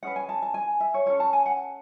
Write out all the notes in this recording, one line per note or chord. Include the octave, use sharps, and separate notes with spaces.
C#4 G#4 B4 F#5
G#5
A5
A5
G#5
E5
C#5
C#4 F#4 A4 C#5
A5
G#5
F#5